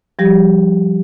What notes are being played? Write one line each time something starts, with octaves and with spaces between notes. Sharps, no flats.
F3 G3 G4